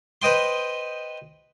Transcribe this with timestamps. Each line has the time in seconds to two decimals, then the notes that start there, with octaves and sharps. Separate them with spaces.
0.22 B4 C5 D#5 G5 C6